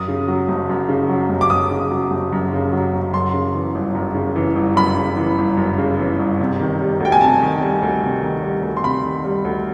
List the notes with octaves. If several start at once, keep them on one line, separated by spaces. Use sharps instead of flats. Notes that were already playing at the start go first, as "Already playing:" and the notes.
Already playing: F#2 D#6
C#3
F#3
F#1
F#2
C#3
F#3
F#1
D6
F#2 D#6
C#3
F#3
F#1
F#2
C#3
F#3
F#1
F#2 C6
C#3
E3
G1
F#2
C#3
E3
G1
F#2 B5
C#3
E3
G1
F#2
C#3
E3
G1
C3
D#3
G3
D2 G5
G#5
C3 A5
D#3
G3
D2
C3
D#3
G3
D2
C6
C3 B5
D#3
G3
D2